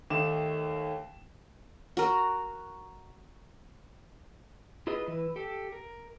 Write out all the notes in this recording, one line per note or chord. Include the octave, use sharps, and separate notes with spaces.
D#2 D#3 A3 D6 E7
F#4 A#4
E4 F4 G#4 B4 D#5
E3 E4 B4
G4 A4
A#4